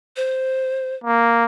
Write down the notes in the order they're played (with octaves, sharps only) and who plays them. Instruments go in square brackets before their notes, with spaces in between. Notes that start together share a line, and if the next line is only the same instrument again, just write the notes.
[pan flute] C5
[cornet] A#3